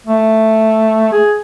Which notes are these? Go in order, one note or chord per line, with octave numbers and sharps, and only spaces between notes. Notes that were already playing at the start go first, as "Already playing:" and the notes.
A3
G#4